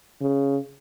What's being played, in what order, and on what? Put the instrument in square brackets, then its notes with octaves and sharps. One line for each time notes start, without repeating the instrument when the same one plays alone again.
[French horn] C#3